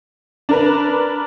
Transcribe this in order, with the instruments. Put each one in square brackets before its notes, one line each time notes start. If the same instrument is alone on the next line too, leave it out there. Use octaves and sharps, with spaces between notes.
[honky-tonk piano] D4 A#4 B4